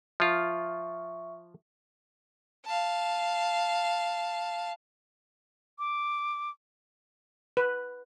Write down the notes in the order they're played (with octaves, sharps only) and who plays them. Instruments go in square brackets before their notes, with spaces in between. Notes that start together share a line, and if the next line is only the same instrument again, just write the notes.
[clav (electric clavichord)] F3 F4 [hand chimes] E5 C#6
[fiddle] F5 A5
[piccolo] D6
[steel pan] B4